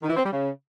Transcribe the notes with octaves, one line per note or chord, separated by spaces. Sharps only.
D#3
E3
C4
G3
C#3